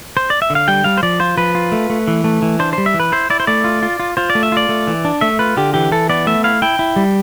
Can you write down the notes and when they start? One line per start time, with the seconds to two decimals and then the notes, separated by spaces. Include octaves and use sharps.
0.17 C5
0.30 D5
0.42 E5
0.50 D3
0.55 F5
0.68 G3 G5
0.84 G3 F5
0.97 C5
1.03 F3 D5
1.20 F4 C5
1.37 F3 B4
1.55 F4
1.72 A3
1.90 A3
2.08 E3
2.24 A3
2.42 E3
2.59 D4 C5
2.73 G3 C5
2.86 E5
2.94 E3
3.00 B4
3.12 E4 C5
3.30 E4 D5
3.40 C5
3.47 A3 D5
3.64 F4
3.83 F4
4.00 F4
4.17 F4 C5
4.30 D5
4.35 A3
4.43 E5
4.52 F4 D5
4.69 A3
4.87 E3
5.05 D4
5.21 A3 E5
5.39 F4 B4
5.57 D3 G4
5.74 E3 G4
5.92 E3 A4
6.09 B3 D5
6.27 A3 E5
6.44 E4 F5
6.62 E4 G5
6.79 E4
6.96 G3